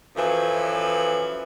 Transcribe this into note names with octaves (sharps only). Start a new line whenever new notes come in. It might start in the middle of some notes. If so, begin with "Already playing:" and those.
F#2 E3 F3 A4 B4